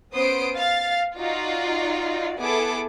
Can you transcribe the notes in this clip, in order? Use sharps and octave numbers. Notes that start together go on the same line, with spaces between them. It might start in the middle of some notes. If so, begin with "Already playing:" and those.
B3 C#4 C5 C6 D#6 D7
F5 A6
D#4 F4 F#4 D5
B3 E4 G#4 A4 D6